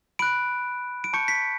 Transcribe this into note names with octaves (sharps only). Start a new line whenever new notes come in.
B5 F#6 D7
D7
A5 C#6 G6 C#7
B6